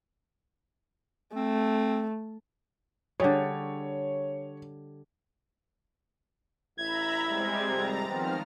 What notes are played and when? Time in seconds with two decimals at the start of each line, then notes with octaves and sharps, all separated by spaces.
1.36 A3 C4
3.20 D3 G3 G#4 C#5
6.78 A1 E4 E5 A#5 B5 G#6
7.25 G3 G#3 C4
7.69 G#1 F2 C3 A#5 A6
8.08 D#3 F3 B3 C4 F6